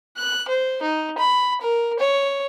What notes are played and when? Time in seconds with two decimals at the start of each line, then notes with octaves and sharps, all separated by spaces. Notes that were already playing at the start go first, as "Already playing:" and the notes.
0.18 F#6
0.48 C5
0.83 D#4
1.18 B5
1.61 A#4
1.99 C#5